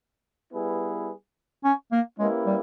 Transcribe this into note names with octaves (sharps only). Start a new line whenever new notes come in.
G3 B3 E4 G#4 B4
C#4
A#3
G#3 A#3 C#4 E4 G4 B4
G3